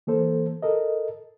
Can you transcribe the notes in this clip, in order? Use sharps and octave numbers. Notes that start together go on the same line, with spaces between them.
E3 A#3 A4 C5
A4 A#4 D#5